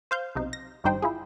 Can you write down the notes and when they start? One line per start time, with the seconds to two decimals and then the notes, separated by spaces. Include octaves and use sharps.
0.11 C5 F5 G6
0.35 B1 C3 D#4
0.53 A#6
0.84 G#1 G2 G3 D#4 C5 G5
1.02 E4 F4 G#4